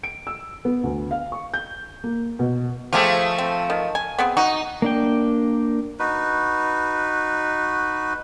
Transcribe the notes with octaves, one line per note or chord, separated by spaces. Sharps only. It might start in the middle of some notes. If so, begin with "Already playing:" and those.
D7
E6
B3
D2
F5
C#6
G6
A#3
B2
F3 A3 F4 G4 G#4
C4
D#3
G#5
B3 C4 G#4
D#4 F#4
A#3 D4 G5
D#4 F#4 B4